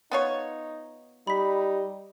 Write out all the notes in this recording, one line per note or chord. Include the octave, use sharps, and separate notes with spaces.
B3 D#4 F4 C#5
G3 D#4 B5 B6